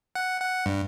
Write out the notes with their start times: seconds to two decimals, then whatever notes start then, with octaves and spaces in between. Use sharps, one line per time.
0.15 F#5
0.40 F#5
0.66 G2